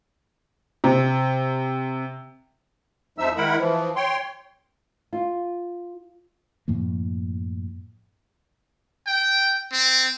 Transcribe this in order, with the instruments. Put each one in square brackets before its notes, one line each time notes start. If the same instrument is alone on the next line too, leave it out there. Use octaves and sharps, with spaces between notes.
[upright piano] C3
[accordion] F2 F3 G#3 D#4 E5 E6
D#3 G#3 E4 A#4 F#5 B5
E3 F3
C#5 G5 C6
[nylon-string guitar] F4
[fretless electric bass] F#2 A2 F3 A#3
[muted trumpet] G5
C4